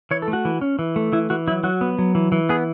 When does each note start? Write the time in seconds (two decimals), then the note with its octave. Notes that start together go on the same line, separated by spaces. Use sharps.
0.11 E3 C#5
0.22 A4
0.28 A3
0.33 F#4
0.45 E3
0.61 C#4
0.79 E3
0.96 A3
1.13 E3 E4
1.30 E3 F#4
1.48 F#3 E4
1.64 F#3 F#4
1.81 B3
1.99 F#3
2.15 E3
2.32 E3
2.49 B3 G#4